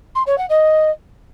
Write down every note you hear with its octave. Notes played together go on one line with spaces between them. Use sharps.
C6
C#5
F#5
D#5